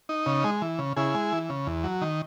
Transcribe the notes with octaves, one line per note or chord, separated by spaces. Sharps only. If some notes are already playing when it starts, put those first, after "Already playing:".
D#4
C#3
G#3
E3
C#3
C#3 E4 G#4
G#3
E3
C#3
E2
F#3
D#3